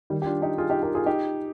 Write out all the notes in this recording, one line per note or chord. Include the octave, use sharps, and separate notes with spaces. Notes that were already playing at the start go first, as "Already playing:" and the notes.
D#3 G3
G4
D4 F4
D#4 G4
F4 G#4
D#4 G4
G4 A#4
F4 G#4
D#4 G4